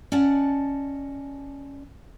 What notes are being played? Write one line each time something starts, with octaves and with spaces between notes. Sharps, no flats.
C#4 D5 D#5 F#5 A5